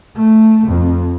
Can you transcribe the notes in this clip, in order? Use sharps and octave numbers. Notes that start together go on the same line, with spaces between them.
A3
F2